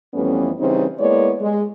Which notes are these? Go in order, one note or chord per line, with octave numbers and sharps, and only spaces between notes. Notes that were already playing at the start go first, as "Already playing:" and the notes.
F2 E3 G3 A3 B3 C#4
C#3 E3 G3 C4 D#4 C5
G#3 A#3 B3 E4 C#5 D5
G#3